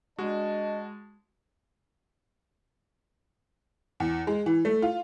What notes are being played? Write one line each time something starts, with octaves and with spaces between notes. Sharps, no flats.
G#3 D4 F#4 D#5 A5
E2
G#3
E3
A3
F4